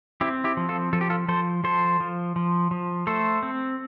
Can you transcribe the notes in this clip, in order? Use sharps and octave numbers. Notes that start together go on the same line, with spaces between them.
C4 E4 G4
E4 G4
F3
F4 A4
F3 A4
G4
F4 A4
F3 A4 C5
F3 A4 C5
F3
F3
F3
A3 A4 C5
C4